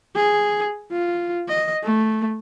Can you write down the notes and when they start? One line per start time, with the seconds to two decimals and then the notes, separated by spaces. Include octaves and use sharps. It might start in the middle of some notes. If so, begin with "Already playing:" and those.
0.16 G#4
0.92 F4
1.48 D#5
1.83 A3